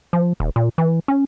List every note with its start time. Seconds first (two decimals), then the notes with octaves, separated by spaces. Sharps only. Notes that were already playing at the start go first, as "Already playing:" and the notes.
0.13 F3
0.40 D#1
0.56 A#2
0.78 E3
1.08 C#4